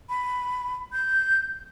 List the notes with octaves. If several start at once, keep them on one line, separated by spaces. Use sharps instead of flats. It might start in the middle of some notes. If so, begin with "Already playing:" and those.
B5
G6